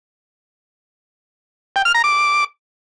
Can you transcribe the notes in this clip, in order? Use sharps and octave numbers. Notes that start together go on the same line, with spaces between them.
G5
F6
A#5
D6